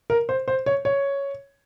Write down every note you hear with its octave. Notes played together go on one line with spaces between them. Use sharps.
A#4
C5
C5
C#5
C#5